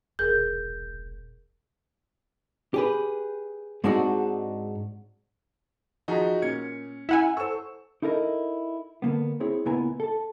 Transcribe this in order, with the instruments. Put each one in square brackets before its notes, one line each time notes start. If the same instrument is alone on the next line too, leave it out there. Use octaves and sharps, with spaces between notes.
[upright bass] E1 A#1 [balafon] G#4 A#4 [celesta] G6
[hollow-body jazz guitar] G4 G#4 B4
G#2 G#3 C4 D4 D#4 F#4
[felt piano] F3 A#5 B6 [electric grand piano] D#4 F#4 G#4
[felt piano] A#2 [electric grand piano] C#4 G#6 C#7
[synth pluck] E4 F#5 G#5 [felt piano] E6 E7
[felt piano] A4 C5 [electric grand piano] C#6 E7 [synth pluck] E6
[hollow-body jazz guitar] D#4 E4 A4 A#4 D5 D#5
D3 A#3 B3
C4 E4 G#4 C#5
C#2 A#2 B3 E4 G#5 A#5
A4 A5